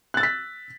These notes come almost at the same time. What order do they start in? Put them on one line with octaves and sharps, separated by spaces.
F#6 A6 E6 B6